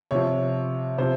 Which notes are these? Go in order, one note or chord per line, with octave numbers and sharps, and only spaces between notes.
C3 F3 C#5
C3 F3 C5